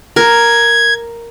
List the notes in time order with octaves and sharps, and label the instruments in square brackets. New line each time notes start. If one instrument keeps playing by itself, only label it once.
[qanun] A#4 [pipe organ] G#6